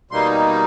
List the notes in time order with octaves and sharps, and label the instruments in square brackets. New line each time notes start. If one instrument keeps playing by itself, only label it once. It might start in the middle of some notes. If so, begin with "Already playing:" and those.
[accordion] B2 G3 A#3 D#4 C6